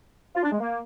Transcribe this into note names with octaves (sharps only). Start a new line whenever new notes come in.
F4
D4
G#3
A#3